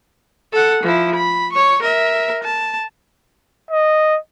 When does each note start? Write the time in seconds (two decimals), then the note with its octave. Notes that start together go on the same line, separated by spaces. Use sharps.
0.53 A4 F#5
0.83 F3 E4
1.15 B5
1.53 C#5 C#6
1.82 A#4 E5
2.43 A5
3.71 D#5